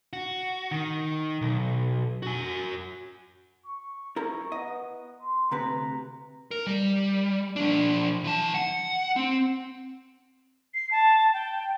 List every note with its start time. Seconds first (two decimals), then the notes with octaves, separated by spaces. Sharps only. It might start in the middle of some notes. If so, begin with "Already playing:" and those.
0.13 F#4
0.71 D#3
1.41 B1
2.23 F#4 G#5
3.66 C#6
4.16 E4 A#4 A#5
4.52 B3 D#5
5.22 C6
5.51 D2 C3 B4 A#5
6.51 A#4
6.67 G3
7.56 F3 D4
8.24 E3 A5
8.55 F#5
9.16 C4
10.74 C7
10.91 A5
11.33 G5